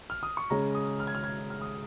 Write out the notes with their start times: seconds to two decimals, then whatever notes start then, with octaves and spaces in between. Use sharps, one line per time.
0.10 F6
0.23 D#6
0.37 C#6
0.50 C#3 G#3 C#4 A#5
0.75 D#6
1.00 F6
1.07 G#6
1.15 F6
1.24 G#6
1.50 F6
1.61 D#6